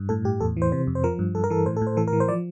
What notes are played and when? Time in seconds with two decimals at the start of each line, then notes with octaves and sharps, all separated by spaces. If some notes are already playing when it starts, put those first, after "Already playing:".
Already playing: G2
0.09 A2 A4
0.25 A2 G4
0.40 E2 A4
0.57 E3
0.62 C5
0.72 C3 C5
0.87 F2
0.95 C5
1.04 F3 A#4
1.19 G2
1.35 G2 A4
1.44 A#4
1.50 E3 A4
1.66 A2 C5
1.76 A4
1.82 A2
1.87 C5
1.97 E3 A4
2.07 A#4
2.13 E3
2.20 C5
2.28 F3 D5